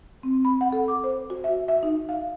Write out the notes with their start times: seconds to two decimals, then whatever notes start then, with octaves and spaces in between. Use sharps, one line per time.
0.23 C4
0.45 B5
0.61 F#5
0.73 A4
0.88 D6
1.04 C5
1.30 F#4
1.44 E5
1.68 E5
1.83 D#4
2.09 F5